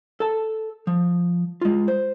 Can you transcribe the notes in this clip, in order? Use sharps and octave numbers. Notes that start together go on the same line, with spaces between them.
A4 A5
F3
G#3 F4
C5